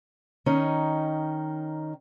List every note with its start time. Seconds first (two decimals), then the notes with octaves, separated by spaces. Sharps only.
0.46 D#3 C#4 D#4